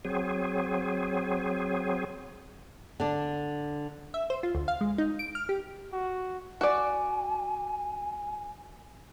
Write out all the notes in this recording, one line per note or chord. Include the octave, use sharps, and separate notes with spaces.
F#3 C4 G#4
D3 D4
E5
C5
F4
D2
F5
G#3
D#4
D7
F6
G4
F#4
F#4 D5 G#5